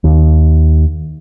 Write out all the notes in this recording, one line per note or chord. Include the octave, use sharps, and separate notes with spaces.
D#2